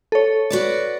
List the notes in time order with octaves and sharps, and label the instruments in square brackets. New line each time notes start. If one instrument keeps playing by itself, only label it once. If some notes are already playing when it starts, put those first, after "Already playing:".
[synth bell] A4 C#5
[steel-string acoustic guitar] F#4 B4 D5